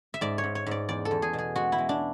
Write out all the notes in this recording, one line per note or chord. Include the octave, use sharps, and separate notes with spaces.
E5
G#2 D5
C#5
G#2
C#5
G#2 D5
E2 D5
A4
E2
G#4
B2
G#4
G#3 F#4
E4
G#3
D4